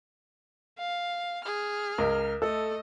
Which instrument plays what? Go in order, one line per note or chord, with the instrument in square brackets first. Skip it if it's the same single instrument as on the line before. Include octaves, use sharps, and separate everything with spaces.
[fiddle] F5
[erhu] G#4 [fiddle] F6
[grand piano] C#2 [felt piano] A#4
[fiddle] A3 [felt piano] A4 [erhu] D#5 [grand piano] E6